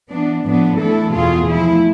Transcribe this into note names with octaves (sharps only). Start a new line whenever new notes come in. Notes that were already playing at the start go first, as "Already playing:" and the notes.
E3 B3 D4
A2 F3 B3 D4
E3 A3 E4 A4
E2 B2 B3 F4 G#4
F3 A3 E4